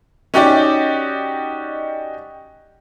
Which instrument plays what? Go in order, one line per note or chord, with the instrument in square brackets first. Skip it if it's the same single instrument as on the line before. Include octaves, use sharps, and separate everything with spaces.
[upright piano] C#4 D#4 F#4 G4 D5 D#5